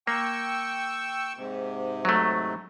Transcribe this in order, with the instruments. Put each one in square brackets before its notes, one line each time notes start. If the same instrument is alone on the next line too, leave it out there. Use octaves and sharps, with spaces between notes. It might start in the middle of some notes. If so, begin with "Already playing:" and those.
[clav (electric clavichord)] A#3 [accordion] G5 C#6 E6
[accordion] G#2 C3
[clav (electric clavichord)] F#3 A3